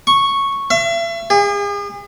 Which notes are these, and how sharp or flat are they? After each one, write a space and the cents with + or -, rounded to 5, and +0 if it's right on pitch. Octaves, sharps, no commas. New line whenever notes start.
C#6 -5
E5 +40
G#4 -40